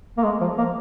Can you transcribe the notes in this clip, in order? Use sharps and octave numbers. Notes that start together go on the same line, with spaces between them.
A#3
G#3
F3
A#3